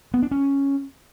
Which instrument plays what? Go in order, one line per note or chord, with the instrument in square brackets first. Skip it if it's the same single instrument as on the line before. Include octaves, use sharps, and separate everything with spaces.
[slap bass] B3
D4
C#4